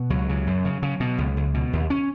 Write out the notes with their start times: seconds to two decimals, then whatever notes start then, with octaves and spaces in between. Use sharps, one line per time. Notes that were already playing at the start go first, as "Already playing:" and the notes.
Already playing: B2
0.10 C#2 F#3
0.29 C#3
0.47 F#2
0.65 C#3
0.82 C#3
1.00 B2
1.18 C#2
1.37 C#2
1.54 B2
1.73 D#2
1.90 C#4